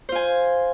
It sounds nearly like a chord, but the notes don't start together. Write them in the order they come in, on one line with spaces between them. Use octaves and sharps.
C5 F4 G#5